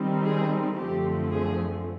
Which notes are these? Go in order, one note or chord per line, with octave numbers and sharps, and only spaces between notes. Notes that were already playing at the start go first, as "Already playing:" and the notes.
Already playing: D#3 G3 C4 D#4
G#4
F#2 D3 F3 A3 C4 G4
G#4